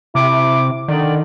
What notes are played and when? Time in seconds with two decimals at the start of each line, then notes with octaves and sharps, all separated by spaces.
0.15 C3 E4 D6
0.88 D3 D#3 D5